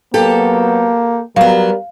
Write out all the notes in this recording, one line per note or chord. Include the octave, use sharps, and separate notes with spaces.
F#3 A#3 B3 G4 A4
F#3 G3 B3 A#4 F5